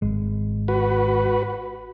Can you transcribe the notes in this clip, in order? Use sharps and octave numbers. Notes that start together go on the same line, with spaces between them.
G#1 G#3
F#4 B4